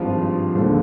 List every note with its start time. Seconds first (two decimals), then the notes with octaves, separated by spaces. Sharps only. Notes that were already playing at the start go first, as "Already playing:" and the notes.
Already playing: G#1 G2 F3 G#3 F4
0.55 D#2 D3 F3 G#3